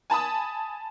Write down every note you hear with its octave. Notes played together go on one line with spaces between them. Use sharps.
G#5 A5 B5 D#6